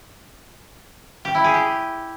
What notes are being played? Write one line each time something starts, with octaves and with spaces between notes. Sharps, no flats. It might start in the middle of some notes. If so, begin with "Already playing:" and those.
G4
E4
G#4
G4